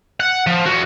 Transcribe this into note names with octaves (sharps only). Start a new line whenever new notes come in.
F#5
F3
E2 F#4